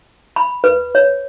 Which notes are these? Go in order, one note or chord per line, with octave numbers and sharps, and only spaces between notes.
B5
B4
C#5